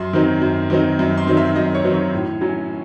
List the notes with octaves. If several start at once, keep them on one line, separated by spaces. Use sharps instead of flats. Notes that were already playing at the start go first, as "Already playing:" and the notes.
Already playing: F#2 C6
D#3 F#3 C4 D#4
F#2
D#3 F#3 C4 D#4
F#2
C6
D#3 F#3 C4 D#4
E5
F#2 D#5
C#5
D#3 F#3 C4 D#4
C#5
A2
F#3 C#4